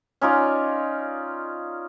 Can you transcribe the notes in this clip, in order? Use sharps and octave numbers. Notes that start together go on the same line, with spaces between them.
C#4 D#4 F4 D5